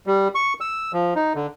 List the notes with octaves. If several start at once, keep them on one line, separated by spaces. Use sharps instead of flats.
G3
C#6
E6
F3
D#4
D3